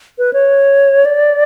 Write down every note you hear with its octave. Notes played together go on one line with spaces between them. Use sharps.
B4
C#5
D5